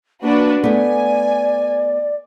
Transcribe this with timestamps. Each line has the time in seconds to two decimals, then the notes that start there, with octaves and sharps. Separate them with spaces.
0.23 A#3 D4 F#4 B4
0.64 A3 B3 D5 G#5